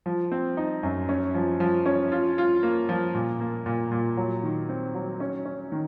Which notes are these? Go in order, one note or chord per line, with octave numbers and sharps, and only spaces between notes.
F3
C4
D#4
F#2
C#4
F3
F3
C#4
F4
F4
A#3
F3
A#2
A#3
A#2
A#2
F#3
D#3
C4
F#3
C#4
C#4
D#3